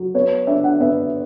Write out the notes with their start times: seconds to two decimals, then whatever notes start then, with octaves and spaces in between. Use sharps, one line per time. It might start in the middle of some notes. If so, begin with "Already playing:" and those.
Already playing: F#3
0.14 B3 C#5
0.47 D4 E5
0.64 F#5
0.80 B3 E5